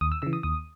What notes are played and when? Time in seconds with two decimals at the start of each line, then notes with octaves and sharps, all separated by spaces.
0.01 D#2 D#6
0.12 E6
0.22 C#3 E3 E6
0.33 D#6
0.43 D#2 D#6